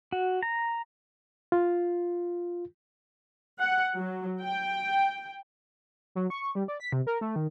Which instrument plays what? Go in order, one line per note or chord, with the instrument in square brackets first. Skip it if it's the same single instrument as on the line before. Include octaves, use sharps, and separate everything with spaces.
[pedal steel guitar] F#4
A#5
[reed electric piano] F4
[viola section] F#5
F#3
G5
[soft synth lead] F#3
C#6
G3
D5
B6
C3
A#4
A3
D#3